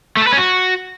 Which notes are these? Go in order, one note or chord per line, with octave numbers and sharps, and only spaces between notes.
A3
A4
B4
C#4
F#4